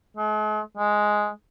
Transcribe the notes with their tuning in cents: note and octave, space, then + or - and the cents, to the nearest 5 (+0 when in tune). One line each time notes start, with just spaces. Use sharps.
G#3 +45
G#3 +5